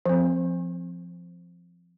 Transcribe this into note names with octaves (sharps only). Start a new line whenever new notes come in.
F3 C4